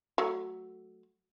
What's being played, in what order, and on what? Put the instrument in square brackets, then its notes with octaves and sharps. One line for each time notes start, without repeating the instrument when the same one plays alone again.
[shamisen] F#3 A3